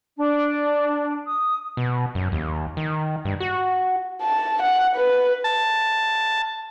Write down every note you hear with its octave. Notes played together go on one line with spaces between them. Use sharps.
D4
D#6
B2
F#2
D#2
D#3
G2
F#4
A5
F#5
B4
A5